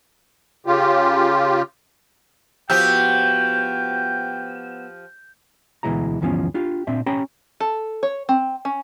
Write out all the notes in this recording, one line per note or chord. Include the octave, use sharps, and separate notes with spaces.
C#3 F4 G4
F3 B3 F#4 G4 G5 E6 G6
D2 B2 E3 G#3 E4 A#5
D2 G2 E3 F3 B3 C#4
D4 F4 G4
A#2 C4 D4 E5
C#4 G4 C#5 G5 A#5 B5
A4
C#5
C4
C#4